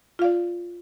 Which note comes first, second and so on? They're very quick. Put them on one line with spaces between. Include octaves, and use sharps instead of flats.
F4 F5 D5